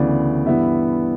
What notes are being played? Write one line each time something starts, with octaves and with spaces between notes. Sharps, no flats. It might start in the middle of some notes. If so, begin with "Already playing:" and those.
Already playing: D2 C#3 E3 B3 D5
G2 E3 B3 E5